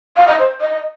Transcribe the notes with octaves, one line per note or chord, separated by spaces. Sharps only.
F5
D#5
C5
D#5